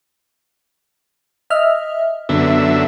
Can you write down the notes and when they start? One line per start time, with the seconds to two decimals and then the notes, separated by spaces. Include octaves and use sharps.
1.50 D#5 E5 F6
2.29 F#2 D3 B3 E5